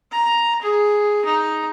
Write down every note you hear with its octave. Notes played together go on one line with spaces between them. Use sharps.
A#5
G#4
D#4